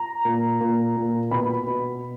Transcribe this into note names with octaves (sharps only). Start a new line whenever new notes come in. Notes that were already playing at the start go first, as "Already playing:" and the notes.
Already playing: A#5
A#2
A#2
A#2
B2 B5
B2